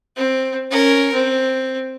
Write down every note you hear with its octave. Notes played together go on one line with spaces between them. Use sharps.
C4
C#4 A#4
C4